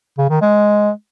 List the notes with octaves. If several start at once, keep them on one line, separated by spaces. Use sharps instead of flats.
C#3
D#3
G#3